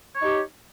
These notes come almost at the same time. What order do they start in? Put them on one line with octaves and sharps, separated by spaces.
C#5 D#4 G4